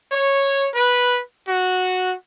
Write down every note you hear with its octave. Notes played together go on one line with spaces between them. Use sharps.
C#5
B4
F#4